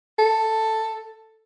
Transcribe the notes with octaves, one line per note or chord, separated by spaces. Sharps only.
A4